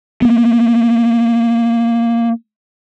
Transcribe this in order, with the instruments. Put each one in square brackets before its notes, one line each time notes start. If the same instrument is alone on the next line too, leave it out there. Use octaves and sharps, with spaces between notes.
[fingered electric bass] A#3 B3